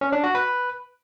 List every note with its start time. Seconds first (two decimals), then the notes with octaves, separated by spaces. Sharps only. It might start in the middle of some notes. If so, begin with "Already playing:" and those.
0.01 C#4
0.12 D4
0.24 F#4
0.35 B4